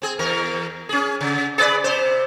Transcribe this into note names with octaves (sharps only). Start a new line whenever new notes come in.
C4 G#4
E2 A#4
C#4 G#4
C#3
G#4 B4 D5
C3 C5